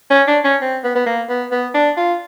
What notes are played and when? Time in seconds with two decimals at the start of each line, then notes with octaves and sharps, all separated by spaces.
0.10 C#4
0.28 D4
0.44 C#4
0.61 C4
0.84 B3
0.95 B3
1.06 A#3
1.29 B3
1.51 B3
1.74 D4
1.97 F4